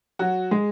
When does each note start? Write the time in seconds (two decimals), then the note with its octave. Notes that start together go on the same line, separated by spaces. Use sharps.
0.19 F#3 F#4
0.51 G#3 G#4